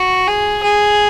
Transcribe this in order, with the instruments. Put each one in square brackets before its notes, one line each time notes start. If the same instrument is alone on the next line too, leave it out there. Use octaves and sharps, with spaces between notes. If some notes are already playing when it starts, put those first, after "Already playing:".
Already playing: [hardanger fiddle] F#4
G#4
G#4